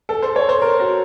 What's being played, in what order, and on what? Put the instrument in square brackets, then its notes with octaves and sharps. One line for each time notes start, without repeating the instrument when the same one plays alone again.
[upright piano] A4
C5
C#5
C5
A#4
F#4